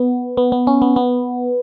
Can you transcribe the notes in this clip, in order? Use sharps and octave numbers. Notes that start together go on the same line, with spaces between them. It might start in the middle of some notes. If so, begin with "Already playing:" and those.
Already playing: B3
B3
B3
C#4
B3
B3